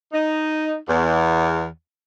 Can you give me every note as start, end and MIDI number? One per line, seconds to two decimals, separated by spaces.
0.12 0.73 63
0.88 1.65 40